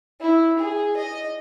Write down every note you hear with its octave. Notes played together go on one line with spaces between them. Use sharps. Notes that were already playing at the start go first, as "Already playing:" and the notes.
E4
G#4
D#5